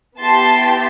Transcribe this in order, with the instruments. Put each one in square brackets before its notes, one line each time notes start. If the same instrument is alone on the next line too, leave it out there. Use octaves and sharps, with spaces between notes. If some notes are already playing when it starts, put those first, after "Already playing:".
[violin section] B3 E4 G4 A5 C6